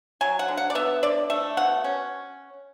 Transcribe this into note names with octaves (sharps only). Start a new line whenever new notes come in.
F#3 G#5
F#5
D3
F#5
D5
B3 E5
D3 D5
A3 E5
B2 F#5
C#4